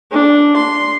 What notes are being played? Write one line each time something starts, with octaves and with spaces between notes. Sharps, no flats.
D4
C6